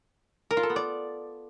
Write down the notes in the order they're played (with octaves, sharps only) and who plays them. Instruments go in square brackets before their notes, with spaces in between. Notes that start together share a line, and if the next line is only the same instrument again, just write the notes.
[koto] A#4
F4
A4
B3
D5